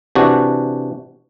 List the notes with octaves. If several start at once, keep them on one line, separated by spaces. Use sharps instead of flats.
C3 E3 D4 F#4